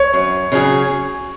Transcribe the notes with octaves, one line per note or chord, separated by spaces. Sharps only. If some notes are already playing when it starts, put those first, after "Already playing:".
Already playing: C#5
F#2
C#3 F#3 C#4 G#4